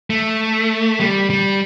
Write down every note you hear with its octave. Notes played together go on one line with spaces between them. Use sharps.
A3
G3
G3